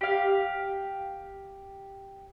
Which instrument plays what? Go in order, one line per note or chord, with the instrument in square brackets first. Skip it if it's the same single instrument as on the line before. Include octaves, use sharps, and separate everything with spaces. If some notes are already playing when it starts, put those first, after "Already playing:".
[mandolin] G4 F5